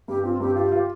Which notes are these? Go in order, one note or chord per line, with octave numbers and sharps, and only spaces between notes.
G2 G4
C4 F4
G2 G4
F4 G4
F4